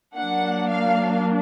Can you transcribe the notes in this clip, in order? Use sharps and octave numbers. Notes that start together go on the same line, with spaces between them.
F#3 A#3 D4 F#5
F5